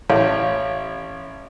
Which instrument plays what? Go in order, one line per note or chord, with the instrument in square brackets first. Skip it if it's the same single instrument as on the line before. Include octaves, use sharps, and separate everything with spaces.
[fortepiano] A1 [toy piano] C#5 F5